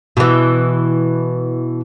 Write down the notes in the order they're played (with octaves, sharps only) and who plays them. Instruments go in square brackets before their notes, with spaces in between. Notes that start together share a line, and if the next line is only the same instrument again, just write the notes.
[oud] B2 E3